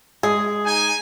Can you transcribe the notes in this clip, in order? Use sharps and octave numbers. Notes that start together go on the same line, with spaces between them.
G#3 G#4
D#4 G#5